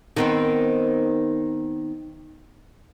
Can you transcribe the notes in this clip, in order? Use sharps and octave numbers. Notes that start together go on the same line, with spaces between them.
D#3 B3 C4